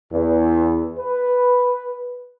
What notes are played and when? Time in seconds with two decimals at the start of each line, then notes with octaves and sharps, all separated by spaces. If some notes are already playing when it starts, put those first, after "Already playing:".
0.12 E2
0.98 B4